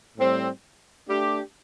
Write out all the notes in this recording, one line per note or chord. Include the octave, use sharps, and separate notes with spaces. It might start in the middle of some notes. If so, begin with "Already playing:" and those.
A2 G3 C4
A3 D4 G4